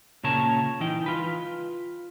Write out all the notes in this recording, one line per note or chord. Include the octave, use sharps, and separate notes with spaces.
A#2 C#3 A#4 C#5 A5
E3 D#4 G5
F4 B4